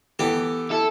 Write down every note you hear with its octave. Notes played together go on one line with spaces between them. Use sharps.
E3 B3 G4 A4
E4 A4